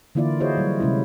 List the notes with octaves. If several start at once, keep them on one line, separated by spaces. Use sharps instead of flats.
D3 E3 A#3 E4 F4 D5
E4 F#4 G#4 C5 C#5 D#5
F#3 G3
C3 G#3 C#4 E4